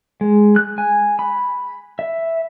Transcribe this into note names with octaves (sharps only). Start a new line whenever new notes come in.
G#3
F#6
G#5
B5
E5